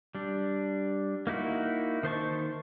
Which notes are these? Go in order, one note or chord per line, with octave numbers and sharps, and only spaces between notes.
G3 D4
A#3 D#4 E4 F#4
D#3 C5 A5 C#6